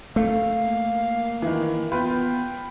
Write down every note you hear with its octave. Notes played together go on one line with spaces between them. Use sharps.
A3 F5
A#3
D#3 E3
B3 F4 B4 G5